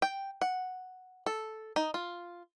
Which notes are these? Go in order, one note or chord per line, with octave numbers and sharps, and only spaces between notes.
G5
F#5
A4
D#4
F4